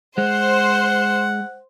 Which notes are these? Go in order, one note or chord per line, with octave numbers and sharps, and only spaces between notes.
G#3 C5 F#5